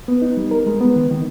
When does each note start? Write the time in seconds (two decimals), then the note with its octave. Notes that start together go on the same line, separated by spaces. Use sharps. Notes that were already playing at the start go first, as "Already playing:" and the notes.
0.08 B3
0.22 D#4
0.37 G3
0.51 A#4
0.67 G#3
0.81 B3
0.96 D#3
1.10 D#3